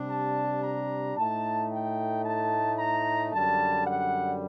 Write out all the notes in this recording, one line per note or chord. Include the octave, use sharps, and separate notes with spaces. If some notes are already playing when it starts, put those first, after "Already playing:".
Already playing: C3 G3 D4
A5
A#5
A2 A3 D#4 A5
G5
A5
A#5
F#2 D3 G3 A5
F#5